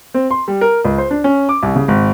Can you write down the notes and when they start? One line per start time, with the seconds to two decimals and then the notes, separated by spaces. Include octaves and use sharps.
0.14 C4
0.31 C6
0.48 G3
0.61 A#4
0.85 C#2
0.98 C5
1.11 D4
1.24 C#4
1.49 D6
1.63 C2
1.75 C#3
1.88 G#1